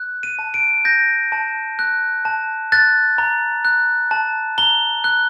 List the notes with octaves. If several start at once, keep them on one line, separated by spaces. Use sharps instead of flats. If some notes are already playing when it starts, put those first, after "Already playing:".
Already playing: F#6
D#7
A5
D7
G6 A#6
A5
F#6
A5
F#6 A6
A#5
F#6
A5
A#5 G7
F#6